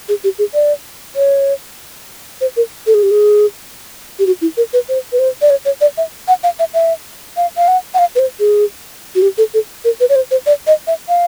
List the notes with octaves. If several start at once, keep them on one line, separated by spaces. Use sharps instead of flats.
G#4
G4
G#4
D5
C#5
C5
A#4
A4
G#4
G4
G#4
G4
F#4
E4
A#4
B4
C5
B4
C5
D5
C#5
C#5
D5
E5
F#5
F5
E5
E5
F5
F5
F#5
F#5
F5
B4
C5
G#4
F#4
G4
A4
A4
A#4
B4
C#5
C5
C5
D5
D#5
E5
F5